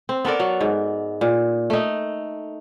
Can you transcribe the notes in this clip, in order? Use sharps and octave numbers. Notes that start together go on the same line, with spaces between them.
C4
B3 A4 A#4 D5
F#3
G#2
A#2
A3 D#4